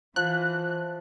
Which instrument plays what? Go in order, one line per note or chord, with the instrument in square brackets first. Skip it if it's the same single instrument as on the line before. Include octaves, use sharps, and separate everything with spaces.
[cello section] E3 [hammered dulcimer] F3 [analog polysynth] F#6